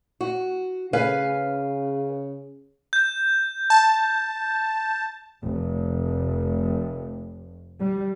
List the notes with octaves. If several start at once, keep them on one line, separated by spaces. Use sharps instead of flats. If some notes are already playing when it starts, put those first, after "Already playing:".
F#4
C#3 B4 F5 G#5
G6
A5
F1
G3